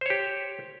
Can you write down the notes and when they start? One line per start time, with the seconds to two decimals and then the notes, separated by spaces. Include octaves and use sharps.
0.01 C5
0.06 C#5
0.10 G4